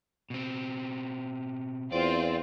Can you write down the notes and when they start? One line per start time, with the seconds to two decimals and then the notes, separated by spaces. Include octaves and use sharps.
0.30 B2 C4
1.92 E2 C4 F4 D5